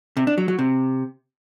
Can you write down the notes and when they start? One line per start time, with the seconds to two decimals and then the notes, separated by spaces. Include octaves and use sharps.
0.17 C3
0.27 D4
0.38 F#3
0.48 F#3
0.59 C3